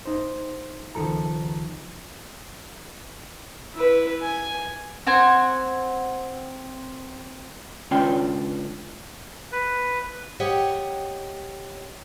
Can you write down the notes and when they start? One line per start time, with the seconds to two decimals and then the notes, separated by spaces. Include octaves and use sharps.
0.05 D#4 C5
0.95 C#2 D#3 F3 A4 A#5
3.74 E4 B4
4.22 G#5
5.07 C4 F#5 G#5
7.91 C#2 C#4 D4 F4 G5
9.52 B4
10.40 G4 C#5 D#5 F#5 G5